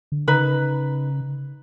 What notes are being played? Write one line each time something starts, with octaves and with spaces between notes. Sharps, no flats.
D3
C#3 D#4 B4